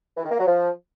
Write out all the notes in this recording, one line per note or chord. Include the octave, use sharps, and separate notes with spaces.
E3
D#3
A#3
F#3
F3